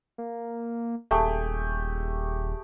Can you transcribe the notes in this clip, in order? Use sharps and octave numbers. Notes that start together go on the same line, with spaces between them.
A#3
D#1 A3 G4 G#4